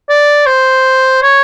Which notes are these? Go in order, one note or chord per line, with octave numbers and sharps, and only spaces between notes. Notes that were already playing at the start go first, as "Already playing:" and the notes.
D5
C5
C#5